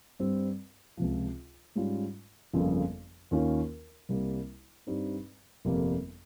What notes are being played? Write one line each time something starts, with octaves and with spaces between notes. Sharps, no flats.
G2 G3 C4
C#2 C3 F3
G#2 G3 C#4 F4
G1 F2 C#3 F3 A#3
D#2 D#3 A#3 C#4 F4
C2 C3 G3 A#3
G2 G3 C4 D#4
G1 F2 C3 G3 A#3